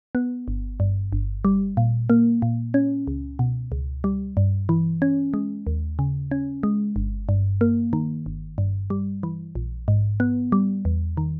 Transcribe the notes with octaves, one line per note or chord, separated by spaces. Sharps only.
B3
G1
G2
G1
G3
A#2
A#3
A#2
C#4
C#2
B2
C#2
G3
G2
E3
C#4
G#3
D#2
C#3
C#4
G#3
G1
G2
A#3
D#3
G1
G2
G3
E3
A#1
G#2
B3
G3
E2
D#3